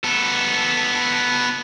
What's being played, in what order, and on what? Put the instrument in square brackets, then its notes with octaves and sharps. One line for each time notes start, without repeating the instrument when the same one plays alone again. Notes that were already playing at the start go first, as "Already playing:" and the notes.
[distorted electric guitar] B3 A4